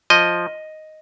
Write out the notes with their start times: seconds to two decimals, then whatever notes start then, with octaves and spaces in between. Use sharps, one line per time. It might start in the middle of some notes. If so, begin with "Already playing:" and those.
0.10 F3 D#5